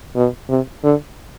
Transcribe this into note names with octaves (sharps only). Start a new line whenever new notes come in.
B2
C3
D3